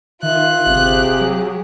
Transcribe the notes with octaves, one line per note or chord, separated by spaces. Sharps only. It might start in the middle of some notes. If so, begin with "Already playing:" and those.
D#3 F4 E5 F#6
G1 C3 G4 G#4
F#3